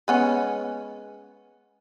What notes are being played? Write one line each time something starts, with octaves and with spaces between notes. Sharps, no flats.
G#3 B3 C#4